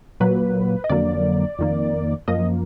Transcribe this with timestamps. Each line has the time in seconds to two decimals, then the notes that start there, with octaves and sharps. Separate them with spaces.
0.20 A#2 F#3 A#3 B4
0.84 D#5
0.89 F2 D3 F#3 A#3 D5
1.59 F2 D#3 A#3
2.28 F#2 F3 A#3 D#5